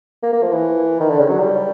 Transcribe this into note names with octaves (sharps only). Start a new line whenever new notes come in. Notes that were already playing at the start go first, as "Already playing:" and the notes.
A#3
A#3
F3
E3
D#3
D3
C#3
F#3
G3